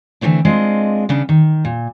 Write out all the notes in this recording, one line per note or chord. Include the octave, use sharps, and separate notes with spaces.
D3 E3 A3 C4 D4
G#3 C4 D4 F4 D#5
C#3 B3 D4
D#3
A#2